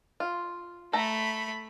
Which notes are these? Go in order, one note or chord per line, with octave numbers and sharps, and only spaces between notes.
F4
A3 A4 A#5 B5